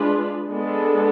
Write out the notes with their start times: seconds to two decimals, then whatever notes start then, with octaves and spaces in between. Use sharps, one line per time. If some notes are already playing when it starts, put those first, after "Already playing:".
Already playing: G#3 D4 F4 G#4 B4
0.49 G#3 B3 D4 A4